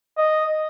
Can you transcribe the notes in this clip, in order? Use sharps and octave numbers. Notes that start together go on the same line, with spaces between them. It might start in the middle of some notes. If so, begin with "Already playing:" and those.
D#5